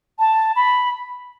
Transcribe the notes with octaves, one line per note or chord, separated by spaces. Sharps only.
A5
B5